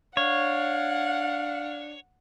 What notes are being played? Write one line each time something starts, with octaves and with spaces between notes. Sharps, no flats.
D4 C#5 F5 F#5